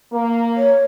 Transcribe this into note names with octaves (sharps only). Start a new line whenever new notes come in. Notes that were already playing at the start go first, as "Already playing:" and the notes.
A#3
C#5